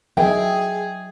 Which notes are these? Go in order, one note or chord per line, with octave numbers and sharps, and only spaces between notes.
F#3 G#4 D#5 E5 G5